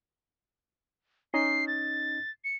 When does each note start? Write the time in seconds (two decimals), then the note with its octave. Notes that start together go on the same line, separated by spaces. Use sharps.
1.34 C#4 D#4 D#5 C7
1.68 A6
2.44 C#7